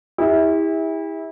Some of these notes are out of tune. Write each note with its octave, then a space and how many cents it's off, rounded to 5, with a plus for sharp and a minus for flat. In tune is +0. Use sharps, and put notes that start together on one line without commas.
E4 -25 G4 +45